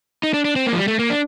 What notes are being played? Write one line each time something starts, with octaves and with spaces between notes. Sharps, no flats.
D#4
D4
D4
C4
A#3
F3
G3
A3
A#3
D4